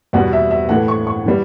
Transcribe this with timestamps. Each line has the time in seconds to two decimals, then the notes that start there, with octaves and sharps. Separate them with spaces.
0.13 E2 B2 G3 F#5
0.33 E5
0.51 E5
0.69 A2 E3 A3 F#5
0.88 C#6
1.07 C#6
1.26 E3 G3